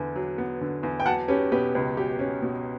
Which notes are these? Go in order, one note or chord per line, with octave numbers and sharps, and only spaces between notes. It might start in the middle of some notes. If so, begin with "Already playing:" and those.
Already playing: E2 D3 B3
F#3
B3
D3
E2
G5
F#3 F#5 A5
C#4 G4 B4
B2 G4 B4
C#2
F#3 G4
C#4
B2